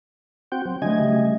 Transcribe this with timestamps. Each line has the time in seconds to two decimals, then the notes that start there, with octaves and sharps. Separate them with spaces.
0.52 C4 F#4 G5
0.66 F#3 C4
0.82 D3 F#3 A3 D#5 G#5
1.00 C#3 G3